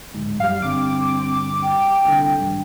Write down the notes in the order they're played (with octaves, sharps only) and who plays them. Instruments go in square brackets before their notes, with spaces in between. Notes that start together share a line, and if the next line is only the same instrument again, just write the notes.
[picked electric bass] D1 G#2
[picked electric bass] F#2 G3 [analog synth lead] F5
[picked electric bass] G1 G2 [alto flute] C4 [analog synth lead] D6
[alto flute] G5
[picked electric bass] C2 D3
G#1 G2